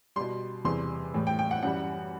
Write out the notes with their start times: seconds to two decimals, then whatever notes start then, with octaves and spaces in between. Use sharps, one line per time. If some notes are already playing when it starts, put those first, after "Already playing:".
0.16 B2 G3 C6
0.65 E2 C3 E3 G3 C6
1.14 A2 E3 G3
1.27 G5
1.39 G5
1.51 F#5
1.63 F#2 E3 G3 F#5